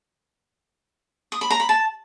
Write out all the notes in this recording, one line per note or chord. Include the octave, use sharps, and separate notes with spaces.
D#6
B5
A#5
B5
A5